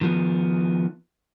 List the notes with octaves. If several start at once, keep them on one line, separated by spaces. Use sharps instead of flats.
D#3 F3 B3